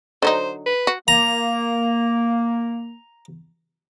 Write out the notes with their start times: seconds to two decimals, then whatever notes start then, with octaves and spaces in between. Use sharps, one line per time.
0.22 D3 F#3 D#4 C5
0.66 B4
0.87 F#4
1.08 A#3 A#5